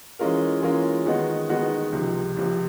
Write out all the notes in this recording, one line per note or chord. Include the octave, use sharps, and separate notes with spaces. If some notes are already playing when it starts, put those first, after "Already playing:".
E3 G#3 C#4 F4 A#4
E3 G#3 C#4 F4 A#4
D#3 G#3 B3 D#4 F#4
D#3 G#3 B3 D#4 F#4
C#2 C3 F3
C#2 C3 F3